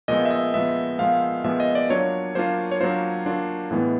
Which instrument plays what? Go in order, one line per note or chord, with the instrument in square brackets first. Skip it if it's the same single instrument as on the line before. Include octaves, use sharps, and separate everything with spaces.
[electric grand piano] A#2 F3 G#3 B3 D#5
E5
D#5
A#2 F3 G#3 B3 E5
A#2 F3 G#3 B3 F5
A#2 F3 G#3 B3 E5
D#5
D5
F#3 A#3 D4 F4 C#5
F#3 A#3 D4 F4 C5
C#5
F#3 A#3 D4 F4 C5
F#3 A#3 D4 F4
A2 E3 G#3 B3